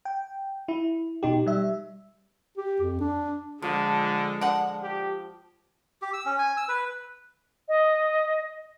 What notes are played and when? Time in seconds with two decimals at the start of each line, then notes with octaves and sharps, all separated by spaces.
0.05 G5
0.68 E4
1.23 B2 D#4 G4
1.46 G3 E5
2.57 G4
2.82 F2
3.00 D4
3.62 D3 F3 G#3
4.41 D3 F#5
4.82 G4
6.02 G4
6.13 E6
6.25 C#4
6.39 G#5
6.57 E6
6.68 B4
7.69 D#5